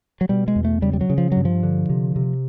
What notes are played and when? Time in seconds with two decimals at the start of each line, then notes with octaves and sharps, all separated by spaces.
0.21 F#3
0.29 B2 G3
0.48 G#3
0.56 E2
0.65 A3
0.82 C#3 G3
0.93 G3
1.01 F#3
1.10 C#3
1.18 F3
1.32 G2 F#3
1.45 F3
1.63 D3
1.89 C3
2.16 C3